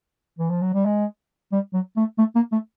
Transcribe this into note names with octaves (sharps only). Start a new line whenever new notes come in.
E3
F3
F#3
G3
G#3
G3
F#3
A3
A3
A#3
A3